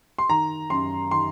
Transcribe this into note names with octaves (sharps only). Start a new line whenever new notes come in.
C6
D#3 A#5
F#2 C6
D#3 C6